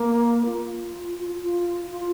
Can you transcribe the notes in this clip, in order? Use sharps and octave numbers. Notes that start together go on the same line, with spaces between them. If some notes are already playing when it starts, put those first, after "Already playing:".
Already playing: A#3
F4
F4
F4
F4